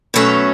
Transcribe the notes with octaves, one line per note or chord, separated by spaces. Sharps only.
B2 F#3 A3 C#4